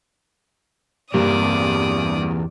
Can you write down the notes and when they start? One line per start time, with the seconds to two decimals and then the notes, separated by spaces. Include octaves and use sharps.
1.14 E2 G2 C3 A#3 D5 D#6